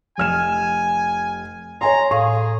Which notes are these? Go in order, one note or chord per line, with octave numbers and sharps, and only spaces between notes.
F1 G#5 F6 E7
C#5 G#5 A#5 C6
A2 G#4 F5